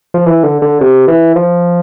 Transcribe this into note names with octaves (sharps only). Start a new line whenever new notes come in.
F3
E3
D3
D3
C3
E3
F3